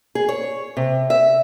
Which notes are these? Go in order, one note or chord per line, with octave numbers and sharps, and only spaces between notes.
G#4
C#5
C3
E5